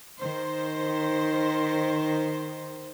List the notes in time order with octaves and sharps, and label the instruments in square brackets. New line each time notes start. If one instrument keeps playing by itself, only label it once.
[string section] D#3 C5